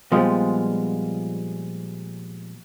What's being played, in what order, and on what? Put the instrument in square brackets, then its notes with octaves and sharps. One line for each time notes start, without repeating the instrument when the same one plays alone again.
[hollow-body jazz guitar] A#2 F3 G3 G#3 B3 F4